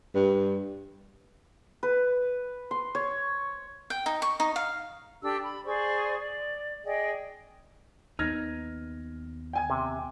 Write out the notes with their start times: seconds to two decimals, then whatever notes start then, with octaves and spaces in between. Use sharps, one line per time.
0.15 G2
1.83 B4
2.71 C6
2.95 C#5
3.90 G5
4.06 D#4
4.22 C#6
4.40 D#4
4.56 F5
5.22 D4 G4 A4 E6
5.43 B5
5.64 G#4 C5 D5 C#6
6.19 D5
6.84 G#4 D5 D#5 G5
8.19 D#2 B3 D#4 F6 G#6 A#6
9.53 G5 G#5 G#6
9.70 C3